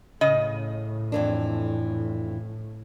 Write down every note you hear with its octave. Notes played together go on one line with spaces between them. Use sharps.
A2 C#3 D#5
F2 E3 D4